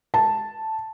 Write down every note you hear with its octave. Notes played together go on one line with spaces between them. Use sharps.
A5